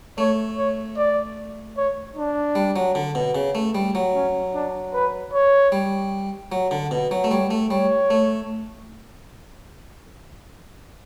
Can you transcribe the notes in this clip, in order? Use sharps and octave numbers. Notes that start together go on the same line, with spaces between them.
A3 C#5
C#5
D5
C#5
D4
G3
F#3
D3
B2
C#3
A3
G3
F#3
C#4
D4
B4
C#5
G3
F#3
D3
B2
F#3
A3
G3 C#5
A3
G3 C#5
A3